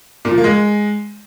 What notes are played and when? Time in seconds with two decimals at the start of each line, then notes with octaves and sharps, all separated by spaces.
0.25 A#2
0.31 F3
0.38 A#3
0.44 G#3